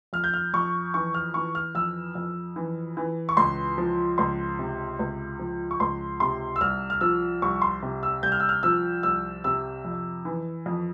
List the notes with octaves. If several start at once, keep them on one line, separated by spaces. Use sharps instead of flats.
F2 F6
G6
F6
F2 C#6
E3 C#6
F6
E3 C#6
F6
F2 E6
F2
E3
E3
C#6
C#2 C6
F3
C#2 C6
C3
C#2
F3
C#6
C#2 C6
C3 C6
E6
C2 F6
F6
F3 E6
C2 C#6
C6
C3
E6
C2 G6
F6
E6
F6
F3 E6
C2 E6
C3 E6
F2
E3
F2